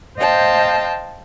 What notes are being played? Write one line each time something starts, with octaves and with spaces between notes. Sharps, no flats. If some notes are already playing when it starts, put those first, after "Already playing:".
C5 D#5 F5 G5 A5